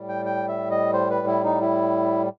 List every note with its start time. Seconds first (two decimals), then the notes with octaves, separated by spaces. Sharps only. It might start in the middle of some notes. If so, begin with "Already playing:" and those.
Already playing: A2 G3
0.09 G5
0.26 G5
0.48 E5
0.71 D#5
0.93 C5
1.10 B4
1.27 E4
1.44 D#4
1.61 E4